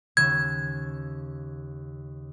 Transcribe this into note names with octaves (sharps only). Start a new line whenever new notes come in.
D#2 C#3 E6 G#6